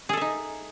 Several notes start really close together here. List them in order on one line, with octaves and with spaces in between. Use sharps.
G#4 A4 E5 D#4